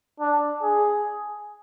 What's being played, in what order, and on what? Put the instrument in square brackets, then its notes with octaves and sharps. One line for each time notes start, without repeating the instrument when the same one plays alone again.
[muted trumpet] D4
G#4